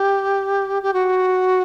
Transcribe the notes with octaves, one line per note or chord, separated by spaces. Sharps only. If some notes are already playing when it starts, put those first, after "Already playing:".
Already playing: G4
G4
F#4